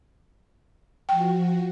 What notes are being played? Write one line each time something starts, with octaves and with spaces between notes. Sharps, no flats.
F3 F#4 G5